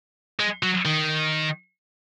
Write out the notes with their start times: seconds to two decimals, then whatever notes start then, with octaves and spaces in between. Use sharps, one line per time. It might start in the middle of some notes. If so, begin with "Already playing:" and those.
0.40 G#3
0.63 F#3
0.85 D#3